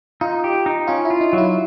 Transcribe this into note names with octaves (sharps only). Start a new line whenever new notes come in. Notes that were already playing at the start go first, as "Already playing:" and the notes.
D#4 F4
G4
D#4
C#4 F4
E4
F4
D#4
F#3
E4